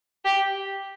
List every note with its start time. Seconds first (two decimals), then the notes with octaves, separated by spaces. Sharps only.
0.25 G4